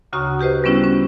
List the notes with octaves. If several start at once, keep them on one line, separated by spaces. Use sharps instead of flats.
D2 C#3 F#4 A#5 C#6 D#6
F#4 G4 B4 C5 D#5
G3 B3 C#4 E4 F#4
C#4